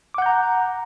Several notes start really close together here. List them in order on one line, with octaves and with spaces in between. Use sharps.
D6 F#5 G6 A#5